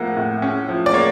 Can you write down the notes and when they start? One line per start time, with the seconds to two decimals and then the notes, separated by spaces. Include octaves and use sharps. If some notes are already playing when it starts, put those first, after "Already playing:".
Already playing: A2 F3 A#3 F#5
0.17 A2
0.42 C#4
0.69 F3
0.86 D5
0.94 A#3 C#5